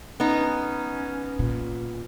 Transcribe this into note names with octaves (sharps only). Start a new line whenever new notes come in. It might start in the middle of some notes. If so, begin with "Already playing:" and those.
B3 C#4 D#4
A#2